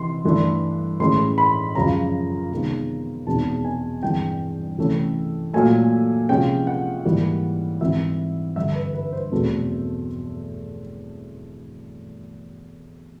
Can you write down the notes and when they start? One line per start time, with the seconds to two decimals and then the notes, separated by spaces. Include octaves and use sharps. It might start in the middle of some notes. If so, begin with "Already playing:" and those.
Already playing: C3 E3 C6
0.25 G2 E3 A3 D4
1.00 A2 E3 G#3 C#4 C6
1.38 B5
1.75 F#2 C#3 F3 G#3 C#4 A#5
2.51 C3 D#3 G#3 B3
3.27 E2 B2 G#3 C4 D#4 A5
3.65 G#5
4.02 G2 E3 G#3 C4 G5
4.78 C3 E3 A3 C#4
5.53 A#2 F#3 A3 G#5
6.29 C3 F3 G#3 C#4 G5
6.67 F#5
7.05 G#2 E3 G3 A#3
7.81 G#2 E3 G3 C4 E5
8.56 G2 D3 G3 E5
8.75 B4
8.94 B4
9.13 C5
9.31 E2 B2 F#3 A3 C4